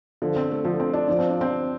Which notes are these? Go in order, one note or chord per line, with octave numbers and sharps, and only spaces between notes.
D3 F3
C4
A3
D3 F3
C4
D4
F3 D4
C4
D4
C4